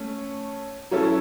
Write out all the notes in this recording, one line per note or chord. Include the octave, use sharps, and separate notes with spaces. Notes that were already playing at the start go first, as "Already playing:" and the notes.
Already playing: A3 C#4
F#3 C#4 E4 A4